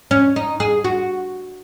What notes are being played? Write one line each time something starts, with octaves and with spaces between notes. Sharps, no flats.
C#4
D#4
G#4
F#4